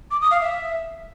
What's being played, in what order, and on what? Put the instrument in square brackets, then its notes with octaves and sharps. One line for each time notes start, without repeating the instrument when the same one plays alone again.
[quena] D6
D#6
F5
E5